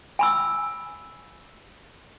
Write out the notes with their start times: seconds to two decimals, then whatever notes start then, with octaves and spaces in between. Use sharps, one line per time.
0.19 G#5 B5 E6